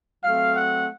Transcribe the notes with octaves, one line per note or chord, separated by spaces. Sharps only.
F#3 A3 C4 F5
F#5